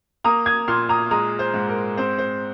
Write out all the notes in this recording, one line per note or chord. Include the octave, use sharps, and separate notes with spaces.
A#3 A#5 D#6
D#6 G#6
A#2 C6 F6
A#5 D#6
G#3 A#5 D#6
C5
G#2
A#4
C4 C5
C5